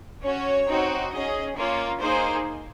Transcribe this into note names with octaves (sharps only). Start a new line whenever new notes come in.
C#4 F#4 C#5
C4 D#4 F#4
C#4 G#4 D#5
A#3 C#4 F4 C#5
A#3 D#4 G#4 C5